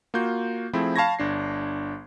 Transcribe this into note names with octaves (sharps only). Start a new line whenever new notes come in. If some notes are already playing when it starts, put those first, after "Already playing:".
A#3 F4 F#4 G6
F3 A3 C4 E4 G#4
F5 A5 B5 C#6 G#6 A#6
G1 D4 C7